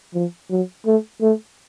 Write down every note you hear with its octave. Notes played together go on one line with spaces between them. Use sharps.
F3
F#3
A3
A3